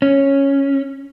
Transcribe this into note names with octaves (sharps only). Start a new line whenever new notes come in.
C#4